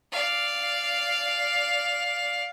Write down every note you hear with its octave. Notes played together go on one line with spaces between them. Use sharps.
D5 F5